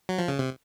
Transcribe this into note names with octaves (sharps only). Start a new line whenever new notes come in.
F#3
F3
C#3
C3